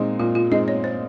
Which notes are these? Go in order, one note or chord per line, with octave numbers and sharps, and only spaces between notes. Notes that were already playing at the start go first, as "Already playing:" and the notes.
Already playing: A#2 G#3 C4 D#4
A#2 F4
F4
G#3 C4 D#4 D#5
C#5
C5